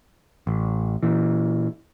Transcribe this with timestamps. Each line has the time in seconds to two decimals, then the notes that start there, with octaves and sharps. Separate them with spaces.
0.47 A1
1.03 A#2 E3